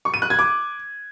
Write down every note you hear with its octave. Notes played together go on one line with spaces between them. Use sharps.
C#6
D#7
F#6
G#6
D6